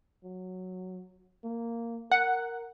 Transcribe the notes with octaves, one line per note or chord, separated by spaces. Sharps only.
F#3
A#3
A#4 F#5